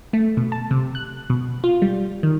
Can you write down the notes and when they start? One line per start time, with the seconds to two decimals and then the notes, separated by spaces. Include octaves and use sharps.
0.13 A3
0.37 B2
0.52 A5
0.71 C3
0.95 F#6
1.30 B2
1.64 F4
1.82 G3
2.23 D#3